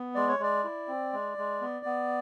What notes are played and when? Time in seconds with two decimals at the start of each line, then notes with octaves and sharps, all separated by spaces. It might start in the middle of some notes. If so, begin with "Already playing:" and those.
Already playing: B3
0.15 G#3 D5
0.28 C#5
0.39 G#3 D5
0.64 E4
0.88 C4
1.13 G#3
1.38 G#3
1.61 B3
1.86 B3